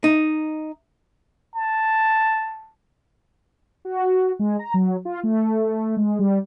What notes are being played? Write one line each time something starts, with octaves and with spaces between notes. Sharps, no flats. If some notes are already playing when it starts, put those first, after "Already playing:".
D#4
A5
F#4
G#3
A#5
F#3
F4
A3
G#3
G3